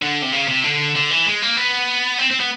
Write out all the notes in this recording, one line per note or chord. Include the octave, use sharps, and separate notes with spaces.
D3
C3
C#3
C3
D3
D3
E3
G#3
A#3
B3
C4
C4
B3